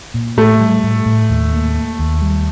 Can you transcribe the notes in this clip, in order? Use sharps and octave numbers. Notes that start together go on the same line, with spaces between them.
A#2
A2 A3
G3
A2
A2
D#2
A#3
A#3
D#2
G3